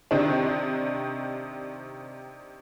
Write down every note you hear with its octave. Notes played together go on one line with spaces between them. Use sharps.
C3 D#3 C4 D4